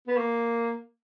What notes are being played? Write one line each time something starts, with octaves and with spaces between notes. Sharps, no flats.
B3
A#3